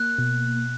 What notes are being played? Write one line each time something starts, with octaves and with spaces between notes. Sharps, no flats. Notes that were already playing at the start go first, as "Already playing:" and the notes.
Already playing: A#3 F#6
B2